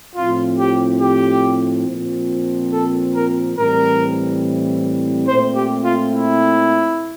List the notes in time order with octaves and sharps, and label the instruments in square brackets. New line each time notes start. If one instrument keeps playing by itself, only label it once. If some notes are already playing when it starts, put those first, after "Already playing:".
[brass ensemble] A2 F3 C4 F4
G4
G4
A#2 F3 C4
A4
A#4
A2 E3 G3 C4 A#4
A#2 A3 C4 C5
G4
F4
E4